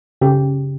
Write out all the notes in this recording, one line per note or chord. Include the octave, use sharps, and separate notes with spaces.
C#3 G4